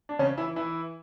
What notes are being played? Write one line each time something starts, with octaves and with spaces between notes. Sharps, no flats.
D4
C#3 C#4
E3 E4
E3 E4